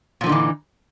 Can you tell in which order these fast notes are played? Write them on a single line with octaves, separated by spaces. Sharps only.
A#2 F3 D3 D#4 E3